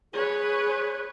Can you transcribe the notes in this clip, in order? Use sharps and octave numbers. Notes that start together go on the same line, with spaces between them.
G#4 B4 C#5